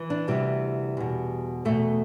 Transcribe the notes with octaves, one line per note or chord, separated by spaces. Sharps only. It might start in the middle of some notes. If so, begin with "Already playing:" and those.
Already playing: E3
D4
D2 C3 E3 G3
E2 B2
E2 B2 A3